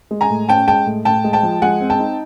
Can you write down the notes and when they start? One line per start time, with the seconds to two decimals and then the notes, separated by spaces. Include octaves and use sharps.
0.11 G#3
0.21 G#5 A#5
0.30 A2
0.49 C#4 G5 A5
0.67 G#3 G5 A5
0.86 A2
1.05 A2 G5 A5
1.24 G#3
1.33 G5 A5
1.43 F3
1.62 G#3 F#5 G#5
1.81 C4
1.90 G5 A5
1.99 D#4